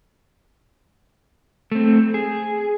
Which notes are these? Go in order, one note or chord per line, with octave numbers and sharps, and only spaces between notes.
A3 C4
G#4